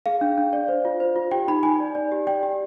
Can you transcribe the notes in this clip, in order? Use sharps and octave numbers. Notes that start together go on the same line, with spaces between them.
G#4 F5
D4
D4
D5
C5
F4
C5
F4
G4 G5
D#4 B5
D#4 G#5
D5
D5
G4
D5 G5
G4